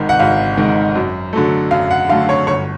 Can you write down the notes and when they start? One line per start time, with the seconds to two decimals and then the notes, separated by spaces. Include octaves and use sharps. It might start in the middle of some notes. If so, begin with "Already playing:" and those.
Already playing: G#1 G#2 D#3
0.09 F#5
0.19 G#1 F5
0.58 G#2 D#3
0.95 F#2
1.33 D3 F#3 A3
1.71 F#2 F5
1.91 F#5
2.09 D3 F#3 A3 F5
2.29 C#5
2.47 G1 C#5